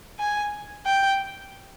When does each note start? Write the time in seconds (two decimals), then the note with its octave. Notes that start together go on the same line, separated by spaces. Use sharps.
0.19 G#5
0.86 G5